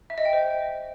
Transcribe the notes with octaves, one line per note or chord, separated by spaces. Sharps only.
E5
D#5
G5
C5